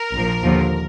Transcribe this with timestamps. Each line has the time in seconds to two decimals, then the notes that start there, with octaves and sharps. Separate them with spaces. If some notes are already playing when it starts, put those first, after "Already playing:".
Already playing: A#4
0.15 A#1 A#2 F3
0.44 D#2 D3 F3